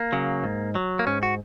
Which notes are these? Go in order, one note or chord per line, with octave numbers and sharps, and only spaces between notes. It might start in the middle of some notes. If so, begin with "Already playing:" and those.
Already playing: A#3
C#3 F#3
G#2
F#3
A#3
G#2 C#4
F#4